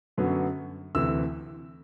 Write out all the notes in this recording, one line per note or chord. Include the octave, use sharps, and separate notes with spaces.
F#2 D3 F#3 B3
D2 C3 E3 E6